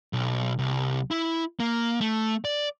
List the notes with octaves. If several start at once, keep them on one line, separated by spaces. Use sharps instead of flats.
B1
C2
E4
A#3
A3
D5